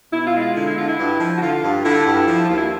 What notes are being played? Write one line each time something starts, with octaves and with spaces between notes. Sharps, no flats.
B2 E4
F4
G#3
F4
D3 E4
E4
D3 F4
E4
G2
F3
F#4
D3 F4
G2
D3 E4
G2
F3
F4
D#2
E4